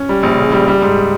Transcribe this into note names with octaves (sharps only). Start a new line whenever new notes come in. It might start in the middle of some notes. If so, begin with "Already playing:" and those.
Already playing: C#4
G3
A#1
C#3
G3
G3
G#2